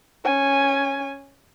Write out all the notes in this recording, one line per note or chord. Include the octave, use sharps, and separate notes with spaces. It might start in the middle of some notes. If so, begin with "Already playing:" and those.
C#4 G#5